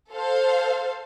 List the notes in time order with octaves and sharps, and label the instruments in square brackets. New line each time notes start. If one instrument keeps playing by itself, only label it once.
[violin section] A4 C5 F5